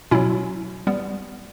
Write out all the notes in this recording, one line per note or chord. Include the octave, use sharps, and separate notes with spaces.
B2 F#3 C#4 E4
G3 B3